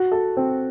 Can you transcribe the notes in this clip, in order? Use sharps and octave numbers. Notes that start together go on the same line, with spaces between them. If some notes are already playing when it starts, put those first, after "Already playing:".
Already playing: F#4
A4
C4